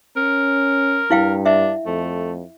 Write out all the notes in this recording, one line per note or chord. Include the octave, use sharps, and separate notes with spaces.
C#4 A#4
G2 E4 F5 G5
D4 E5
F2 A3